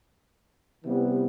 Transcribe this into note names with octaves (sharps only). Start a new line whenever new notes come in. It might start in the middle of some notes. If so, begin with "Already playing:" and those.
C3 E3 G3 B3 E4